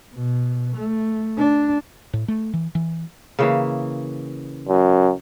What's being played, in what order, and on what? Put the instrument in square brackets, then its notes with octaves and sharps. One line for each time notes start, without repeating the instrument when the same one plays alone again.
[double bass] B2
A3
D4
[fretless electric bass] A2
A3
E3
E3
[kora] C#3 E3 A#3
[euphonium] F#2